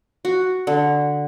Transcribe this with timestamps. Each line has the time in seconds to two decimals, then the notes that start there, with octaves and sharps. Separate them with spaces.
0.25 F#4
0.67 D3